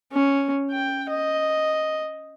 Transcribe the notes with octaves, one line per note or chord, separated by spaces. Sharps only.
C#4
G5
D#5